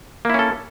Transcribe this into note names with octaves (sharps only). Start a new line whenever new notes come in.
A#3 C#4 E4 A4